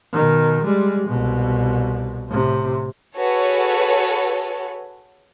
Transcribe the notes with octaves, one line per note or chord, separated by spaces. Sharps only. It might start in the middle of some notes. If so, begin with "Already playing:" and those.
B2 D#3
G3 G#3
C2 B2
A2 C3
F#4 G#4 A4 B4 C#5